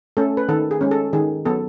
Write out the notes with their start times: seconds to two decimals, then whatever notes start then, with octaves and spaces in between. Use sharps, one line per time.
0.17 A3 C#4 A4
0.37 B4
0.49 D#3 A4
0.71 G#4
0.81 G#3 C#4
0.91 A4
1.13 D#3 G#4
1.45 F#3 B3 A4